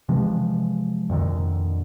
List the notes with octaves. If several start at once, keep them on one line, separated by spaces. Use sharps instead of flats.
C3 E3 F3 G#3
F2 A#2 D3 D#3